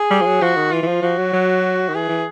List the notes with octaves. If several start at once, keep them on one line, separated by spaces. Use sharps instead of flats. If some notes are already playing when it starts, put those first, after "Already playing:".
Already playing: G#4
G3
F3
F#3
F3 F#4
D#3
E3 F4
E3
F3
F3 F#4
F#3
F#3
D#3
E3 G#4
E3